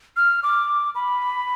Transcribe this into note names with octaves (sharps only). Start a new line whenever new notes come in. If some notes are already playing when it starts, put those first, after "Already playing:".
F6
D6
B5